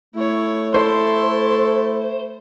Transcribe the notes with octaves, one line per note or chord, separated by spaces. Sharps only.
A3 E4 C#5
E4 A4 C5 C6